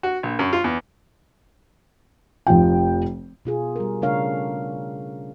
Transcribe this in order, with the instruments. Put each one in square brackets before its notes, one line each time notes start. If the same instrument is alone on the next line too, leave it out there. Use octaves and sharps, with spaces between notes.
[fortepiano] F#4
A#1
F#2
F4
E2
[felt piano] F1 F3 G5
[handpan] B2 F4 G#4
G3 A#4
C#3 A3 D4 A#4 C#5 F5